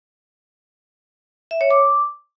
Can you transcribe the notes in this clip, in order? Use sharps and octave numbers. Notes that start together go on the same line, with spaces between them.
E5
C#5
D6